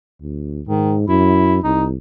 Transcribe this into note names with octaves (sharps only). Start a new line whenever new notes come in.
D2
G#2 D#3
F#2 E4
C2 D#4